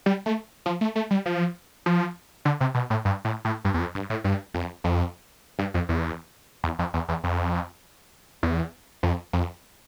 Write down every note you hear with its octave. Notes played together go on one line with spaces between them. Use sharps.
G3
A3
F3
A3
A3
G3
F3
F3
D3
C3
B2
A2
G2
A2
A2
G2
E2
F2
G2
A2
G2
F2
F2
G2
F2
E2
E2
F2
E2
E2
F2
E2
F2
F2